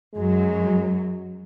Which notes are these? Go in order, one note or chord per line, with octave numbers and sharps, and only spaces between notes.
F#2 F#3 G#3